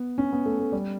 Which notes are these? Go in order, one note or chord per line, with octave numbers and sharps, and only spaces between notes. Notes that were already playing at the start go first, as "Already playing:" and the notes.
Already playing: B3
C#4
B3
A3
A3
G3